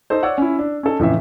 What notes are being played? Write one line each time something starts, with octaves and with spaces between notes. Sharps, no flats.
D#4 A4 C5
C#5 D5 F#5 E6
C#4 E4
D4
C#4 D#4 A4
F2 A2 C#3 E3 E5